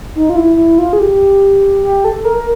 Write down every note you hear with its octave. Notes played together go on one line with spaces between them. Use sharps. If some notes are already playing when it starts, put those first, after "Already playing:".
D#4
F4
E4
E4
F4
G#4
G4
G4
A4
A#4
A#4